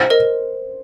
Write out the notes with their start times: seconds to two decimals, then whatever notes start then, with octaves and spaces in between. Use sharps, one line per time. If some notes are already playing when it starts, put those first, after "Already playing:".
Already playing: C5
0.10 A#4 D#5